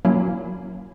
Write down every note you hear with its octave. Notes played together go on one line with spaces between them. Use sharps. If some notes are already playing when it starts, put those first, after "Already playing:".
F#3 A#3 C#4 E4